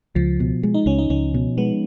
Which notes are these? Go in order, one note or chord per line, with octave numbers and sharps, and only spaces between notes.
C#2 F3
B2
G#3
D#4
C#2 C#4
D#4
C#2 C#4
B2
G#3 B3